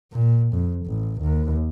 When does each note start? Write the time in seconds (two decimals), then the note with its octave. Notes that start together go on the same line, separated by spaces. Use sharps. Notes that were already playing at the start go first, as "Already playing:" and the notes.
0.13 A#2
0.53 F2
0.86 A1
1.21 D#2